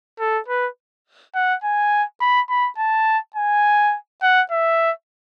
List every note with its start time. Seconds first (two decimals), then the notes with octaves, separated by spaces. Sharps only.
0.20 A4
0.48 B4
1.35 F#5
1.64 G#5
2.21 B5
2.50 B5
2.78 A5
3.36 G#5
4.22 F#5
4.51 E5